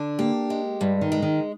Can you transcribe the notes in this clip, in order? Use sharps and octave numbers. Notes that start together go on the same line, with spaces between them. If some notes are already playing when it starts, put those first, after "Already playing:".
Already playing: D3 D4
A#3 G4
G#3
G2 G3
D#3
G#3
D#3